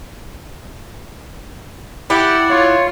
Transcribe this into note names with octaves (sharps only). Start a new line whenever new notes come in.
E4 G4 D5 F#5
F4 C#5